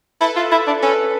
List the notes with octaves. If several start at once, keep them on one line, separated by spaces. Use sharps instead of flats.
E4 A4 B4
F4
E4
D4
C#4 A4 B4